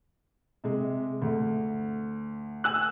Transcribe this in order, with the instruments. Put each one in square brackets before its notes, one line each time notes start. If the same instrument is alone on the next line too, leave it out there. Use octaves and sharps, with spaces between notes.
[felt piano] C3 G#3
D2
[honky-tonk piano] G#5 E6 F#6